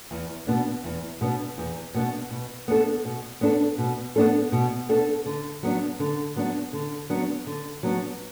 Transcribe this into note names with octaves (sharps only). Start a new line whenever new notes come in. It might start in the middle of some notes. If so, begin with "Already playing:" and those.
E2
B2 B3 D4
E2
B2 B3 D4
E2
B2 B3 D4
B2
B3 D4 A4
B2
B3 D4 A4
B2
B3 D4 A4
B2
B3 D4 A4
D3
F#3 B3 D4
D3
F#3 B3 D4
D3
F#3 B3 D4
D3
F#3 B3 D4